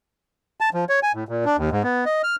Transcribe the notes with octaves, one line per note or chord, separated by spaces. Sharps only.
A5
F3
C#5
G#5
A2
A#2
D4
D#2
G#2
B3
D#5
F6